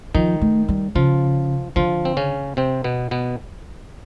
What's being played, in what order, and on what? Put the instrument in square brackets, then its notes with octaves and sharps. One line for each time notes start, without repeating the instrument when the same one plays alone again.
[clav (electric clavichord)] D#3 D#4 [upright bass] F3
[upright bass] A3
G3
[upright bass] C#3 [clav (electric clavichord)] F3 F4
[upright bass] D3 [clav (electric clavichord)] F3 F4
[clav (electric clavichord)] C4
C#3 C#4
C3 C4
B2 B3
B2 B3